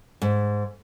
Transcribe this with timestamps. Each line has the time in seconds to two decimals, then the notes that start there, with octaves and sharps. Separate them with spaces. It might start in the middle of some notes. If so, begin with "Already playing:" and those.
0.22 G#2